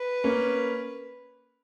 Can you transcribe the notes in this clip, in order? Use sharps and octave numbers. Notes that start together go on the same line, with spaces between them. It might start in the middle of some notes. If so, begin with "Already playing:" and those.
Already playing: B4
A#3 C#4